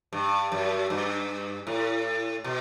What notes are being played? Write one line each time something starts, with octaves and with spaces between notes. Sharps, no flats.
G2
F#2
G2
A2
B2